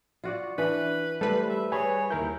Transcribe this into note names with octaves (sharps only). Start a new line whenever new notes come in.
F4 F#4 D5
E3 D4 B4
G3 A3 A4 B4 C5
E5
G#4 C#5 G#5 B5 C#6
D#2 E4 A#4 G6